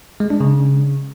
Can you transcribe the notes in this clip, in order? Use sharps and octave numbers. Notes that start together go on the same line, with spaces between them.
G#3
D4
C#3